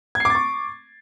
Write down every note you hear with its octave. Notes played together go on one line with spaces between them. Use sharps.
C#6 D6 G#6 A6 C7